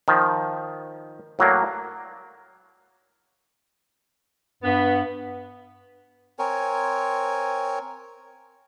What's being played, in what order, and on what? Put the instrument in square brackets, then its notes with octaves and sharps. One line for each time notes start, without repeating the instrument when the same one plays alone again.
[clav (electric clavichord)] D#3 F3
A2 F#3 A#3 D5
[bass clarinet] G2 [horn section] B3
[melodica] C4 A#4 C#5 G#5